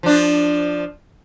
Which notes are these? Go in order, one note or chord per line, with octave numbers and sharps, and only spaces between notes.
F3 D4